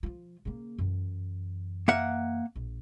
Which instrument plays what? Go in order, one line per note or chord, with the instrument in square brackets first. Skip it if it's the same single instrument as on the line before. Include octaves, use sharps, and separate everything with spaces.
[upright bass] F3 F4
C#3 A#3
F#2 E3
[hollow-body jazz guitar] A#3 E5 F#5
[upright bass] A#1